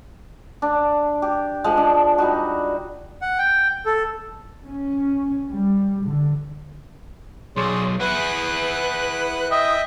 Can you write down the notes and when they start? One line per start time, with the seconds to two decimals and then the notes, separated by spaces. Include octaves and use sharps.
0.62 D4
1.22 G4
1.64 F3 G#3
1.77 D4
2.18 G3 D#4 F#4
3.22 F#5
3.38 G5
3.86 A4
4.65 C#4
5.50 G3
6.06 D3
7.56 B1 G#4 C#5 D5 C6
8.00 E4 G#4 B4 F#5 F#6
9.51 D#5 E5 G5 D#6